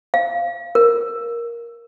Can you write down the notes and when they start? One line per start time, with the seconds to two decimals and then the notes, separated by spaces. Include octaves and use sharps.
0.14 F5
0.75 A#4